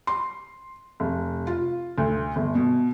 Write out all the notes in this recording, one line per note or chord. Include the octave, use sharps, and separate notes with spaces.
C6
F1
F4
D2
G1
B2